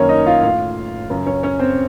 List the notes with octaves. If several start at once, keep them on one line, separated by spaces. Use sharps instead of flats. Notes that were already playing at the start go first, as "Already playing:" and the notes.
Already playing: F#2 D#3 A#3 C#4 A#4 C#5
D#4 D#5
F4 F5
A2 F4 F5
F#2 C#3
C#4 C#5
C#4 C#5
C4 C5